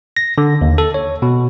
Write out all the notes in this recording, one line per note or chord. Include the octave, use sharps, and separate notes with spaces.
A#6
D3
D#2
A4
C#5
B2